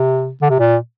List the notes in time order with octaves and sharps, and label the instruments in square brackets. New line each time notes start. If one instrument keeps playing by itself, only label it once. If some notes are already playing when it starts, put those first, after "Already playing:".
Already playing: [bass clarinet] C3
D3
C3
A#2